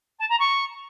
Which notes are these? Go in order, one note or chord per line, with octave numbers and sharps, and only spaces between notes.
A5
A#5
C#6